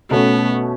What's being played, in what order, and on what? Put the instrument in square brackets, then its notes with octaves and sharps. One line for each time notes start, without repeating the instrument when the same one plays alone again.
[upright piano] B2 A3 C#4 [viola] B3